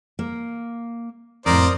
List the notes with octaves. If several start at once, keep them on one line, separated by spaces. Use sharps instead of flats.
A#3
F2 A2 A#4 C5 D5 A#5 D#6